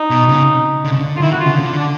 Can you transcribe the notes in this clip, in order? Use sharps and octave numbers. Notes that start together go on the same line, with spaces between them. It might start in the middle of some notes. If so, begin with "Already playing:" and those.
Already playing: D#4
B2
C#3
D3
C#3
D3
F4
D#3 E4
D3 F#4
F4
C#3
D3
D4